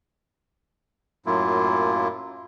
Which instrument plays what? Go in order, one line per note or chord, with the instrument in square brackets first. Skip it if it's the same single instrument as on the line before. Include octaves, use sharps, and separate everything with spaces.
[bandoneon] F#2 A2 F#3 A#3 E4 F4